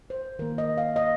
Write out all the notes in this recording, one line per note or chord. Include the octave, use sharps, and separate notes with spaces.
C5
D#3 A#3 A#4
D#5
F5
D#5